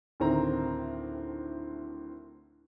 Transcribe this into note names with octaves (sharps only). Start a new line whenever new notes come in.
D2 A2 D#3 C4 A#5